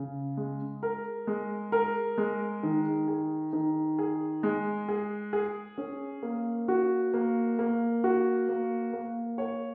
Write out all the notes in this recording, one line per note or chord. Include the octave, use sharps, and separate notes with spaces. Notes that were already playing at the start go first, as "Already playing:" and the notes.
Already playing: C#3
G#3
A#4
G#3
A#4
G#3
D#3
G#4
D#3
G#4
G#3
G#4
G#4
C#4
A#3
F#4
A#3
A#3
F#4
A#3
A#3
C#5